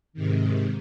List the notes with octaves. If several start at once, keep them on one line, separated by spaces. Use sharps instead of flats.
G#2 C3 D#3